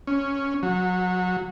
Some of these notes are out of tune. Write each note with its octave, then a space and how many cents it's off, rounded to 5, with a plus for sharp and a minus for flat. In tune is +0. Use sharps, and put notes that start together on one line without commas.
C#4 +0
F#3 -20